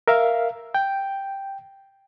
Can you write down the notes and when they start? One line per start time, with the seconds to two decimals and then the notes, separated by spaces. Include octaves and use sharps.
0.08 A#4 E5 F5
0.75 G5